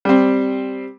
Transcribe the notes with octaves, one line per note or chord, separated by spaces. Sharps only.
G3 C4